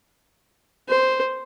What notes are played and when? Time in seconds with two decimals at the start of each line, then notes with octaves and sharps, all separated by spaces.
0.89 C5